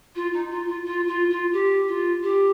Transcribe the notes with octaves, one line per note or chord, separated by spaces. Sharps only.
F4
D#4
F4
F4
F4
F4
F4
G4
F4
G4